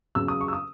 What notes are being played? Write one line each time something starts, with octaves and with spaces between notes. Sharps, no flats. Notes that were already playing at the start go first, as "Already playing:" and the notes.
E2 C#3 F#3 E6
D#6
C#6
E6
D#6